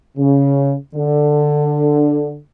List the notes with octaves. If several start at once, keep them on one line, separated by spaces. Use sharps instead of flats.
C#3
D3